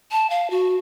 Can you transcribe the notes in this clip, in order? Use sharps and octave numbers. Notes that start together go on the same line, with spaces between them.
A5
F5
F#4